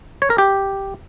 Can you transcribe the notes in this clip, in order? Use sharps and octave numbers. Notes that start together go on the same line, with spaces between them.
C#5
A#4
G4